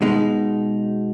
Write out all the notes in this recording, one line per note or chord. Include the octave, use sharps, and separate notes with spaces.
B2 G#3 D#4